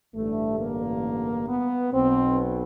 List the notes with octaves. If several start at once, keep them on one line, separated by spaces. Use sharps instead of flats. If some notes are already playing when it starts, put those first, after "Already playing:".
A1 G2 D3 A3
A#3
B3
B1 B2 C4